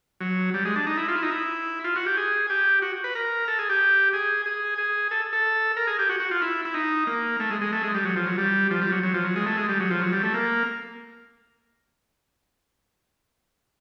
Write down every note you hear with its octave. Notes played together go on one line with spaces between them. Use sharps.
F#3
G3
G#3
D4
D#4
E4
F4
E4
D#4
E4
F4
F#4
G4
G#4
G4
F#4
B4
A#4
A4
G#4
G4
G#4
G#4
G#4
A4
A4
A#4
G#4
G4
F#4
F#4
F4
E4
E4
D#4
A#3
A3
G#3
G#3
A3
G#3
G3
F#3
F3
F#3
G3
F3
G3
F#3
F#3
F3
F#3
G#3
A3
G#3
G3
F#3
F3
F#3
G3
A3
A#3